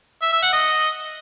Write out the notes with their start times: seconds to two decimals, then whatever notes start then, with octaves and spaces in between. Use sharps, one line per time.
0.22 E5
0.32 E5
0.42 F#5
0.53 D#5